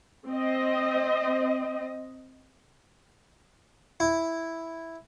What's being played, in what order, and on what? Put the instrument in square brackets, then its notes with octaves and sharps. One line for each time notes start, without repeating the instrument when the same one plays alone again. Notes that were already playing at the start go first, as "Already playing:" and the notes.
[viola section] C4 D#5
[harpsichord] E4